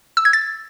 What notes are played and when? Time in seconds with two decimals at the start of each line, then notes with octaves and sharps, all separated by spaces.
0.17 E6
0.25 G#6
0.33 A6